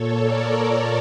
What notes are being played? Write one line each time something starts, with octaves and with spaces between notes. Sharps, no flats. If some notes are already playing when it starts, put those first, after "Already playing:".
Already playing: A#2 A4 C#5
A#4 D5
A#4 D5